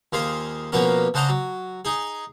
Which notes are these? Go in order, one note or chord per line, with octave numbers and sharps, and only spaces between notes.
D#2 F4 G#4 C5
B2 F3 A#3 B3 C#4 A#4
C#3 D4 C5 D#5 F#5 A#5
F#3
D#4 G#4